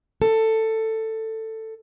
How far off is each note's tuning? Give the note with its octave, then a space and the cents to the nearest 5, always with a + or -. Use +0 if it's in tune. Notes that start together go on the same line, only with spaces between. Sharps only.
A4 +15